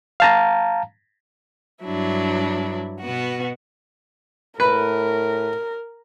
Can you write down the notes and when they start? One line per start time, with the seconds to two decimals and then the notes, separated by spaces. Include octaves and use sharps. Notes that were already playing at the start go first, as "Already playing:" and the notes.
0.20 F5 A5 A#5
1.84 G2 F#3 D4 E4
3.02 B2 B3 F#4
4.60 A2 A#4 B4